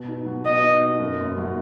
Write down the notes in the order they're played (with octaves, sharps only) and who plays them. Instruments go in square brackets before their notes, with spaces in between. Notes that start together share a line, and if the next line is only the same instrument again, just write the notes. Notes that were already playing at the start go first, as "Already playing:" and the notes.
Already playing: [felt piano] B2
D#4
F#3
[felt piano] B2 [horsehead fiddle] D#5
[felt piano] D#4
D#4
F#2
F#1
F#3